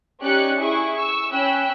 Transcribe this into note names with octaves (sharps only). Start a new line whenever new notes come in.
C#4 D#4 G4 D5 F#6 C#7
E4 G#4 C#6
C#6 E6
C#4 G5 B5 E6 F#6